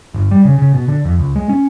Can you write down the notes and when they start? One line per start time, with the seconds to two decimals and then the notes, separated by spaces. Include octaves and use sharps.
0.14 G1
0.31 G3
0.45 C#3
0.58 C#3
0.74 B2
0.88 D3
1.05 F2
1.19 C#2
1.36 G#3
1.49 C#4